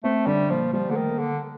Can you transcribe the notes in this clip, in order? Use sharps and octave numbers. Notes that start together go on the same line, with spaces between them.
A3 C4
D3 G3
A#2 F3
F3 G3
D3 A3
D#3
A#3
D3